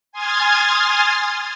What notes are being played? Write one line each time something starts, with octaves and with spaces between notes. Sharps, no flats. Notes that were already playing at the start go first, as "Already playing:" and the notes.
G#5 C6 D#6 F6 G#6 A6